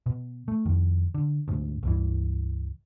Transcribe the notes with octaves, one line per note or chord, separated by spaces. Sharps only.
B2
A3
F2 D#3
D3
D2 G#2
C#2 G2 E3